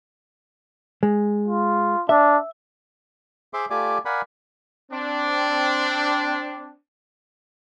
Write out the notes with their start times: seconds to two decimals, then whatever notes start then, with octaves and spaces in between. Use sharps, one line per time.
1.03 G#3
1.48 F4
2.09 D4 E5
3.54 G#4 C5 E5 C6 D6
3.70 A3 F4 G4 D5 G#5 D6
4.05 A#4 D5 F5 F#5 G#5 B5
4.91 C4 D4